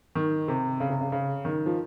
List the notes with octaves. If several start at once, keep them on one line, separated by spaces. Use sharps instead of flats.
D#3
C3
C#3
C3
C#3
C#3
D#3
F3